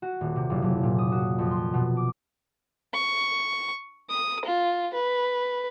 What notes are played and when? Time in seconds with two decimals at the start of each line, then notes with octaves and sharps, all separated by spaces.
0.02 F#4
0.21 D#1
0.36 C3
0.50 F#1
0.62 F#1
0.83 A#2
0.99 D#6
1.12 F#4
1.38 F2
1.51 C6
1.74 B2
1.97 D6
2.94 C#6
4.10 D#6
4.45 F4
4.94 B4